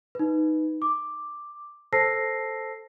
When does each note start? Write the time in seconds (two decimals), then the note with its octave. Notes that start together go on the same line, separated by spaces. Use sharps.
0.15 D#4 B4
0.82 D6
1.93 A4 C5 A5 E6 A#6 C7